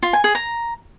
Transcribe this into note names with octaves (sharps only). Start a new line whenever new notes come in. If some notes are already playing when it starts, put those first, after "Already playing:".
F4
G#5
G#4
A#5